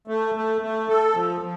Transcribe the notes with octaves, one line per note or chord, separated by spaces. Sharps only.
A3
A3
A3
A4
F3
F3